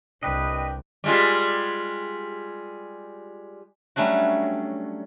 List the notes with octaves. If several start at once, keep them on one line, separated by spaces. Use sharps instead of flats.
C2 G2 D4 B4 D#5 G5
G3 G#3 F4
F#3 G3 A3 C#4 D4 F#4